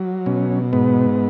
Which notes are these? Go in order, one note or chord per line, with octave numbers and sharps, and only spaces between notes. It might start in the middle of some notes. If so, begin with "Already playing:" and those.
Already playing: F#3
B2 C#4
G#2 B3